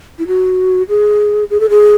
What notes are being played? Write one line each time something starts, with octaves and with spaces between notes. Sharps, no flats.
E4
F#4
G#4
G#4
A4
G#4